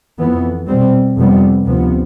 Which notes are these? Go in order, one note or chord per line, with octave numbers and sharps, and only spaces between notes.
F2 E3 B3
B2 G3 C4
F2 C3 G3 B3
D2 C3 F3 B3